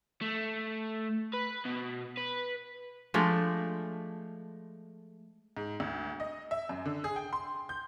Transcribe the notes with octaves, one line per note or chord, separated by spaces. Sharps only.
A3
B4
B2
B4
F3 G#3 A3 D4
G#2
D2
D#5
E5
F#2
D3
G#4
G5
C6
G6